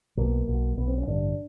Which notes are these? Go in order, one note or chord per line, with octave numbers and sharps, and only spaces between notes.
B1 B2 A#3
B1 B2
B1 B2 B3
C4
C#4
A1 G2 D3 D4